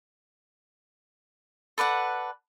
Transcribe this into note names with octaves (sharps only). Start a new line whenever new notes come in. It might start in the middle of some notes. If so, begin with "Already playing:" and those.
A4 B4 D5 F#5